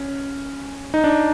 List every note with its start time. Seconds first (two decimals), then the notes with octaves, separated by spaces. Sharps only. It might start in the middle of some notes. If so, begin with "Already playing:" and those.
Already playing: C#4
0.94 D#4
1.04 D4